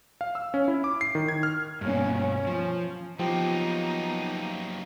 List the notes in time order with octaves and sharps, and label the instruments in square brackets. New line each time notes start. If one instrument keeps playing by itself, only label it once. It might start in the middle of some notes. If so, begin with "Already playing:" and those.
[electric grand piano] F5
E6
C#4
E4
D6
C7
D#3
G#6
F6
[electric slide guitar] G2 B2 [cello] A#3 C#4
[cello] C#4
[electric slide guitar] F3
[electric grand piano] F3 [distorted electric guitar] F#3 A#3 [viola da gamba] B3 D#4 [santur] G4